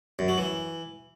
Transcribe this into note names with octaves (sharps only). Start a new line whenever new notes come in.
F#2
F#3
E3